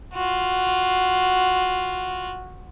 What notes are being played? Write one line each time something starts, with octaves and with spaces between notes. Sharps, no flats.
F4 F#4